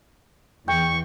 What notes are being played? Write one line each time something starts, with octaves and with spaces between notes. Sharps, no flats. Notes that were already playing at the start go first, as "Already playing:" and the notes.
E2 G5 C#6